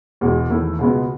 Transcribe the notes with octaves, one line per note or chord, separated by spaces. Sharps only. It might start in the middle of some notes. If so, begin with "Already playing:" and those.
E1 E2 B2 G#3
E2 D#3 A3 E4
C#2 B2 G#3 B3